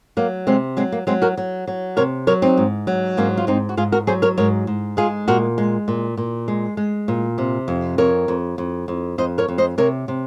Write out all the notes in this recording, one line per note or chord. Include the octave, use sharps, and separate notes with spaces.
F#3 A#3
C3 G#3 C4
F#3 G#3 C4
A#3
F#3 G#3 C4
F#4 A#4
F#3
F#3
C3 A#4 C#5
F#3 A#4 C#5
C4 D#4
G#2
F#3
G#2 A#3 C#4
F4
G#2 C4 D#4
F#4
G#2 F4 G#4
F#4 A#4
F#3 G#4 C5
A#4 C#5
G#2 A#4 C#5
G#2
G#3 F4 G#4
A#2 F#4 A#4
G#3
A#2
A#2
G#3
G#3
A#2
C3
F2
F2 A#4 C#5
F2
F2
F2
F2 C5 D#5
A#4 C#5
F2
C5 D#5
C3 A#4 C#5
C3